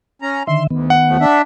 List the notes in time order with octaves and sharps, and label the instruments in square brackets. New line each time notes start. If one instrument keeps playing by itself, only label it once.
[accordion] C#4 A#5
[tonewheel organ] D3 D#3 E5 [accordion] C6
[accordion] D2 [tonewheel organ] D#3 B3
[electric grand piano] F#5
[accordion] D#2 F3 A3
D4 E5